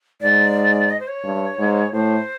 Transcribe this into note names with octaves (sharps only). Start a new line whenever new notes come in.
G#2 D5
D#5
C5
C#5
G2
G#2
A2 C5